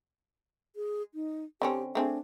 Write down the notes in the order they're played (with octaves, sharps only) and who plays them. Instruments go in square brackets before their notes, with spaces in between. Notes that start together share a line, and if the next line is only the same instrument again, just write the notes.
[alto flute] G#4
D#4
[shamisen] D3 C4 C#4 [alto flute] G4
[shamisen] A3 C4 G#4 [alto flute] D4